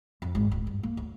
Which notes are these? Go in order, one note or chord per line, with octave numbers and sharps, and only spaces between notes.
F2
G#1
D1
G2
A#3
D2